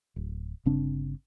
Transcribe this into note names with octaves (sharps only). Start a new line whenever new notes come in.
D1
G1 C#3 C4 D4